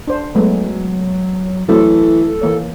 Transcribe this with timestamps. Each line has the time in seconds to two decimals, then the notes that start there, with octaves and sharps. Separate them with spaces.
0.08 D4 C5
0.35 F#3 G#3 A3 B3
1.69 E3 F#3 A3 C4 A4
2.42 E3 A#3 C#5